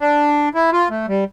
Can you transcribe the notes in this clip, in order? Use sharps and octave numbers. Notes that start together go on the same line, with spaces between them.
D4
E4
F4
A3
G3